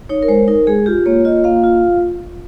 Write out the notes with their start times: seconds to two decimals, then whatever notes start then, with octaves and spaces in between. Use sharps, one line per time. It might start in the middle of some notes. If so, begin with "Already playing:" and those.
0.09 D#4 C#5
0.23 A#4
0.28 G#3 C5
0.48 D#4 A#4
0.67 G#3 G#4
0.86 F4 G4
1.06 A#3 C#5
1.25 F4 D#5
1.44 A#3 F5
1.64 F4